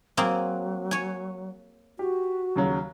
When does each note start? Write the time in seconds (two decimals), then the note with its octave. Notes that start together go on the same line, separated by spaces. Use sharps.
0.17 F#3 A#3 C4 G#4
0.91 C#5 G#5
1.99 F#4 G4
2.56 D#2 C#3 F#3